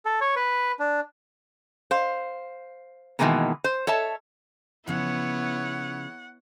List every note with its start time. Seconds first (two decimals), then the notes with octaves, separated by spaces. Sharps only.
0.05 A4
0.21 C#5
0.36 B4
0.79 D4
1.91 C5 F5
3.19 B2 D#3 E3 G#3 A#3 B3
3.64 C5
3.87 A4 C#5 E5 A5
4.87 C#3 F3 B3 E4 C#5 F#5